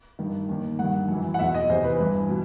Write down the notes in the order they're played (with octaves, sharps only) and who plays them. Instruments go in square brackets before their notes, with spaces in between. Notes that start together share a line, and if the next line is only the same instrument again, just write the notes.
[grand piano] G2 D#3
D#2 D#3
G2 D#3 F#5
F#2 E3
F#5
E2 B2 E5
D#5
E2 C3 E3 C5
B4
G2 E3
B2